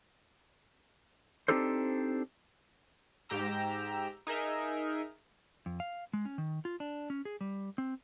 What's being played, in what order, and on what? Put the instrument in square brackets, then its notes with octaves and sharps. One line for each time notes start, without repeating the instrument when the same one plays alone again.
[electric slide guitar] C4 D4 D#4 G4 A4 C5
[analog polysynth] G#2 G4 G5 A#5 E6
D#4 G#4 A#4 E5
[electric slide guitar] F2
F5
G#3
C#4
D#3
F4
D4
C#4
G#4
G3
C4